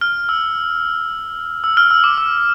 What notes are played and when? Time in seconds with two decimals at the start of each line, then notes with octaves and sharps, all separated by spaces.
0.01 F6
0.29 E6
1.64 E6
1.77 F6
1.91 E6
2.04 D6
2.18 E6